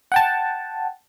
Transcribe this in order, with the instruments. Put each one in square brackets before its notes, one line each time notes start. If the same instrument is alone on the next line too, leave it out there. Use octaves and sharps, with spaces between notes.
[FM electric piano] F#5 G5 A5